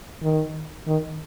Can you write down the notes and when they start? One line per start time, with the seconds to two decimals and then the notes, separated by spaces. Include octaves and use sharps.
0.23 D#3
0.87 D#3